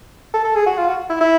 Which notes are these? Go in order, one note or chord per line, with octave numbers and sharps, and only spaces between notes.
A4
A4
G#4
F#4
F4
F#4
E4
E4